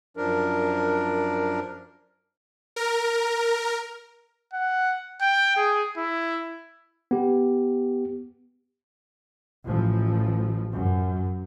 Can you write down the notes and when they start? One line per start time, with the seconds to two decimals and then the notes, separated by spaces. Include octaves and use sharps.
0.17 F#2 F3 D4 A#4
2.76 A#4
4.54 F#5
5.21 G5
5.57 G#4
5.98 E4
7.11 B3 G4
9.65 A1 F3
10.74 F#2